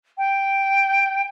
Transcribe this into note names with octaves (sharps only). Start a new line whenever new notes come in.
G5